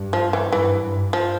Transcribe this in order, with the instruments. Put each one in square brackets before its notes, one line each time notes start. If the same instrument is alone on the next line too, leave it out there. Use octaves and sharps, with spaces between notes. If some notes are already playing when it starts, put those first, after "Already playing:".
Already playing: [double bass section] G2
[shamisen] F3
E3
[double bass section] G2 [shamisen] E3
[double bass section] G2
[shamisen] F3